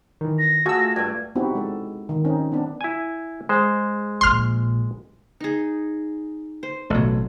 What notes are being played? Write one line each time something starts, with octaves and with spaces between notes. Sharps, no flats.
D#3 E3
A#6
A3 F4 F#4 G#4 E6
G2 A3 G#6
B3 C4 D#4 E4 F#4 G4
G#3 A4
D#3
C4 C#4 D#4
B3 C4 D4
E4 G#5
G#3 C5
A#1 A#2 C6 F6
D#4 G#4
C5
A1 B2 F#3 A3